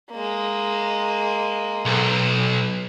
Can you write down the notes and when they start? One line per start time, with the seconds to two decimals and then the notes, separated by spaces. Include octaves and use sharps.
0.12 G#3 A#3
1.85 B1